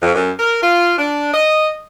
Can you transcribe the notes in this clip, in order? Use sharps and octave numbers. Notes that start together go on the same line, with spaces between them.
F2
F#2
A#4
F4
D4
D#5